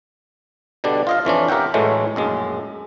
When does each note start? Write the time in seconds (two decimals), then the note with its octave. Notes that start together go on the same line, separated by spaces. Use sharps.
0.84 B2 D3 G3 D4
1.07 F4 D#5 F5
1.25 F2 E3 C#4 D4
1.48 G4 A#4 E5 F#5 G5
1.74 A2 E3 F#3 G#3 A3
2.16 A#1 F#2 G#3